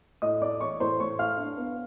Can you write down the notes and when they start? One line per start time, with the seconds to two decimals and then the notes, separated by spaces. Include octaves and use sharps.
0.22 A2 D#5 D#6
0.42 A3 D5 D6
0.61 E3 C#5 C#6
0.80 A2 C5 C6
1.00 A2 C#5 C#6
1.19 A3 F5 F6
1.38 D4
1.57 B3